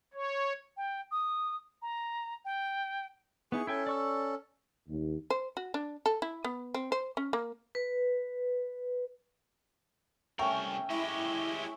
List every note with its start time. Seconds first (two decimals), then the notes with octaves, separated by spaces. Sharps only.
0.14 C#5
0.77 G5
1.11 D#6
1.82 A#5
2.45 G5
3.52 B3 D#4 E4 G#4 C#6
3.67 C#4 E4 A4 G5 G#5
3.87 D5 C#6 E6
4.88 D#2
5.30 C5
5.57 F#4
5.74 D4
6.06 A4
6.22 E4
6.44 B3
6.74 C4
6.92 C5
7.17 C#4
7.33 A#3
7.75 B4
10.39 C2 A3 C#4 A#4 G5
10.90 G#3 E4 G4